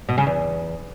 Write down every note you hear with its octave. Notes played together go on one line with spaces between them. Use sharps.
B2
C#3
E2